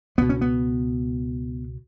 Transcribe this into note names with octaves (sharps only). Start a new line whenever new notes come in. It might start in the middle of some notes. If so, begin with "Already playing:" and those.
C#2 B2 B3
C#4
B3